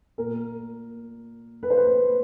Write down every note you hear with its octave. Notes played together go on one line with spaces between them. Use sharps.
A#2 A#4
B4
C5
B4
B4